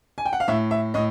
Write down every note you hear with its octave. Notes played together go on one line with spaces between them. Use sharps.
G#5
G5
F#5
F5
A2 E5
E5
A2 D#5